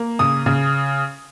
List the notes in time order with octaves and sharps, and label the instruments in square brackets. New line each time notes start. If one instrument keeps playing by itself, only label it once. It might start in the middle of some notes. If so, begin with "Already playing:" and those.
Already playing: [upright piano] A#3
C#3 D#6
C#3